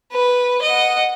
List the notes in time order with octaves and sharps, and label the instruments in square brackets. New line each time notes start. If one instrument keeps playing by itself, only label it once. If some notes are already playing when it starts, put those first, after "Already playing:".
[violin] B4
D#5 F#5